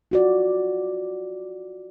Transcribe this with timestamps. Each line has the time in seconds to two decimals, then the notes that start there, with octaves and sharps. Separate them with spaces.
0.11 F4 F#4 D5